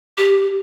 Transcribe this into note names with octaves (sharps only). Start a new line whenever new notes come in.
G4